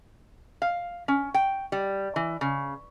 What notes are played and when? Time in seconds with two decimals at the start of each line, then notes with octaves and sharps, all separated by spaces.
0.62 F5
1.08 C#4
1.34 G5
1.72 G3
2.16 E3
2.41 C#3